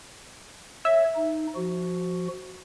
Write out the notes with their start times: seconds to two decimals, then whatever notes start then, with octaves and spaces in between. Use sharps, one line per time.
0.85 C#5 E5
1.16 D#4
1.56 F3 F#4